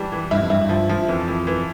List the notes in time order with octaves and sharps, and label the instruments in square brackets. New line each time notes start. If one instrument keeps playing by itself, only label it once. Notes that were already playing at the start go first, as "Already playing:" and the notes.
Already playing: [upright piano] E3 G3 D4
E3
[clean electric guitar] G2 [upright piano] E4
[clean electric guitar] F2
[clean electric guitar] G2 [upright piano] E4
[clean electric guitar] G2
[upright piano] F3
F3
[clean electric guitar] F2 [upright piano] E3
[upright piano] E3
E3